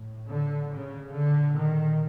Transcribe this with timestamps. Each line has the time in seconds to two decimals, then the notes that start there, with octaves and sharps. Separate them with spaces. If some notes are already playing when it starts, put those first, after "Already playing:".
Already playing: A2
0.29 D3
0.72 C#3
1.14 A#2 D3
1.56 D#3